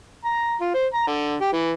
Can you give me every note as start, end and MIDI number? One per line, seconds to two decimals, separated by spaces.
0.25 0.54 82
0.61 0.73 65
0.74 0.86 72
0.94 1.04 82
1.07 1.35 50
1.41 1.51 67
1.53 1.71 52